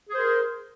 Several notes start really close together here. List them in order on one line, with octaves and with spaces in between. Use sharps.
G#4 C5 A#4